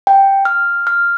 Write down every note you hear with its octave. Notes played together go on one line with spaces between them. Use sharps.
G5
F6
F6